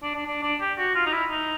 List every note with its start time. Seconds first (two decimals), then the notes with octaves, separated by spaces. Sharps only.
0.03 D4
0.15 D4
0.26 D4
0.43 D4
0.60 G4
0.78 F#4
0.95 F4
1.06 D#4
1.12 E4
1.30 D#4